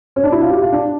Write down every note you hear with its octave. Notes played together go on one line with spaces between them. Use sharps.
C#4
D4
E4
F4
G4
F4
D4